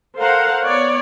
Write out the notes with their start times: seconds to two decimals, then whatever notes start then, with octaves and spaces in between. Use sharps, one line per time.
0.16 A4 A#4 C5 F5 F#5 A#5
0.65 B3 C#5 D5